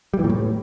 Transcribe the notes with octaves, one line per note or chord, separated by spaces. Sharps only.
G3
E3
A#2
A2